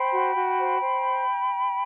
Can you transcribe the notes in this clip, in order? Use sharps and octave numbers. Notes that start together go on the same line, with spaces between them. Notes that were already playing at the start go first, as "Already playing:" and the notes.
Already playing: C5 G5 B5
F#4
F#4
C5
C5